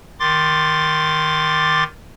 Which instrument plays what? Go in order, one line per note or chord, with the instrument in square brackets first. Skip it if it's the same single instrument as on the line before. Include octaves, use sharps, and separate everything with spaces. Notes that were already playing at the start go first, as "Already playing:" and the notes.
[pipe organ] D#3 C6 D6 A6